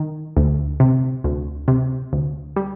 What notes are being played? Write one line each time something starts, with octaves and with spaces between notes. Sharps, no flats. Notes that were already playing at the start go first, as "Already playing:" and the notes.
Already playing: D#3
D2
C3
D2
C3
D2
G3